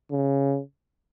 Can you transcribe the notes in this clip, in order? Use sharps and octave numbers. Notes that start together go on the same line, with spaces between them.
C#3